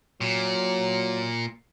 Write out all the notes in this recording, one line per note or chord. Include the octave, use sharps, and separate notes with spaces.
A#2 F#3